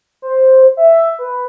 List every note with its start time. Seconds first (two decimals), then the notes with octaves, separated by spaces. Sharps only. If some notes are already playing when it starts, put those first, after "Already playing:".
0.22 C5
0.77 E5
1.19 B4